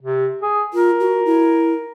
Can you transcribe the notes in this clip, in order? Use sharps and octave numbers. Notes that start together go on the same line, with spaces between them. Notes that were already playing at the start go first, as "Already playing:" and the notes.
C3
G#4
F4 A#4
F#4
E4